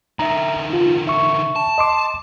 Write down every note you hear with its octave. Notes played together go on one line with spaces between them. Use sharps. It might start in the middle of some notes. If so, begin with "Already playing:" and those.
D3 D#4 E5 A#5
F4
E5 C#6
A5
D#5 C6 D6